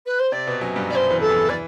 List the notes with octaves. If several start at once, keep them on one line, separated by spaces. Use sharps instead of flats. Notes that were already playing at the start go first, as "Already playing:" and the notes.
B4
C5
C3 C4 D5
B2 B3
F#2 F#3
G2 G3
G2 G3 C5 D5
E2 E3
A4
E2 E3
E3 D5